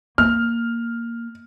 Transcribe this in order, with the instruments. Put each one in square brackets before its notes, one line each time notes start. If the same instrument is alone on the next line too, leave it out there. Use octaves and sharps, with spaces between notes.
[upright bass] A#3 [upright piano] F6